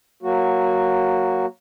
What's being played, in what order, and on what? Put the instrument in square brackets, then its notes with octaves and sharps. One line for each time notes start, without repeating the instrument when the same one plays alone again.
[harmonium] F#3 A#3 F#4